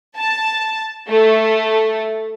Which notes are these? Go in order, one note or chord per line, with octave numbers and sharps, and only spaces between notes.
A5
A3